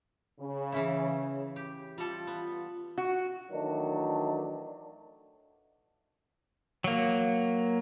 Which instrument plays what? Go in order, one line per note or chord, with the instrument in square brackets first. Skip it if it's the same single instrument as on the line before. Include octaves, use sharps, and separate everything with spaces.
[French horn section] C#3
[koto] E3 C#4 E4
G4
[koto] G3 A4 [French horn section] F4
[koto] B3
[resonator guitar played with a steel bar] F#4
[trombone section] D#3 E3 F#3 A3 D4
[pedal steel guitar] F#3 A#3